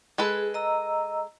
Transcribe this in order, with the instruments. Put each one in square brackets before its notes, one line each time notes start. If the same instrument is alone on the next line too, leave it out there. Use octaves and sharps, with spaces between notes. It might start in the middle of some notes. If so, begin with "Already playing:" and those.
[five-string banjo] G#3 A4 B4 [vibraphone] G#4
[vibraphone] D#5 A#5 E6